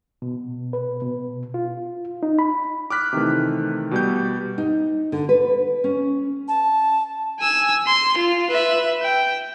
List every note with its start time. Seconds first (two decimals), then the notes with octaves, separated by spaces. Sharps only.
0.22 B2
0.73 B4
1.02 B2
1.54 F4
2.23 D#4
2.39 B5
2.90 D6 F6 F#6 B6
3.13 C3 D#3 E3 A3
3.91 B2 G3 G4 G6
4.58 D#4
5.12 D3
5.29 B4
5.84 C#4
6.48 A5
7.40 G#5 E6
7.86 C6
8.17 F4
8.50 B4 E5
9.02 G5